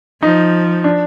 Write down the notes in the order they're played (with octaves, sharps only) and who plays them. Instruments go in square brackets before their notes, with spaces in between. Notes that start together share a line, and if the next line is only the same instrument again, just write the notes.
[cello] F3 [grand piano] D#4
[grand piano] D4